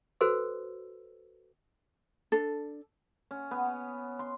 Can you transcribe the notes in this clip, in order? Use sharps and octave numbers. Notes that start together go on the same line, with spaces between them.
F#4 A4 B4 C5 E6
D4 A4
C#4
B3
C6